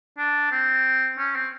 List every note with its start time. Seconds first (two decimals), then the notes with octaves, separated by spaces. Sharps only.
0.18 D4
0.52 C4
1.18 C#4
1.35 C4